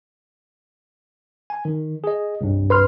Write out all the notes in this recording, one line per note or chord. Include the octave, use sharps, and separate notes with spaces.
G#5
D#3
G#4 D#5
C2 G2
B4 C6 F6